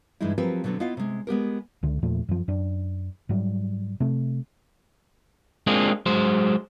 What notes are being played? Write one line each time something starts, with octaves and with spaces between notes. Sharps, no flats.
G2 E3 G#3 D#4 E4
F3 F#3 C4 G4 A#4 B4
B2 D3 F#3 B3 C4
B3 E4 F4 D#5 F5
C3 G#3
G#3 B3 G4 A#4
C#2 D3
E2 A#2 F3 A3
F#2 F3
F#2 D4
G#2 F#3 G3
C3 A3
G#3 A#3 C4 D4 F4 G#4
F#3 G#3 C5